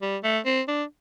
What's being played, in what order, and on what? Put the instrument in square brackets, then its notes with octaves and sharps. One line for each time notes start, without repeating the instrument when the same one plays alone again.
[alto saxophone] G3
A3
C4
D4